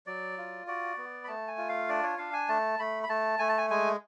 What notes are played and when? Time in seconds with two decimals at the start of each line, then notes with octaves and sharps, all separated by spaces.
0.07 F#3 D5
0.37 F4
0.67 F#4 D5
0.97 B3
1.24 B5
1.28 A3 A5
1.48 G#5
1.58 F4
1.69 F5
1.89 D4 D5
2.03 C#5
2.18 D4 F5
2.33 G#5
2.49 A3 A5
2.79 A3 B5
3.03 B5
3.09 A3 A5
3.39 A3 G#5
3.49 A5
3.58 G#5
3.70 G#3 G#5